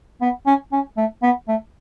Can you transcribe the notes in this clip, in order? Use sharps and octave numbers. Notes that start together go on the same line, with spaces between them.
B3
C#4
C#4
A3
B3
A3